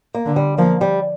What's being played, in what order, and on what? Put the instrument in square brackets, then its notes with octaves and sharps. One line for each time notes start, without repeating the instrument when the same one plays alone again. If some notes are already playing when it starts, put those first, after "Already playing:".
[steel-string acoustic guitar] A#3
[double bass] D3
[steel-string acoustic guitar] G3
[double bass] F3 [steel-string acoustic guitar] A#3
[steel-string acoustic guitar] G3